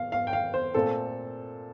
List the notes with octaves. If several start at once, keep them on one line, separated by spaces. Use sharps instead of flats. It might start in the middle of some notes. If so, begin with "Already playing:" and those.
Already playing: F5
F5
G5
F5
C5
A#2 A3 C4 A4